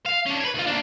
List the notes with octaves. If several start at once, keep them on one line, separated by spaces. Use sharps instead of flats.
F5
C#4 D4
B4 C#5
D2 F4
A#3 D4